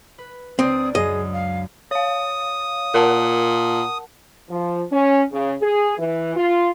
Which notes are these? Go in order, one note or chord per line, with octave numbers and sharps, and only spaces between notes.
B4
C#2 C4 D4 D5 D#6
F#2 F#3 G#4 D#5
F5
C#5 F5 D#6
A#2 A#4 F#5 A5
F3
C#4
C#3
G#4
E3
F4